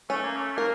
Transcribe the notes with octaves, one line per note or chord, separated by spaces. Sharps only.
A3 C#4
A#3
A3
A3
A#3 A#4